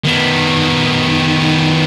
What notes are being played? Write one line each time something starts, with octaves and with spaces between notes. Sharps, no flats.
D#3 B3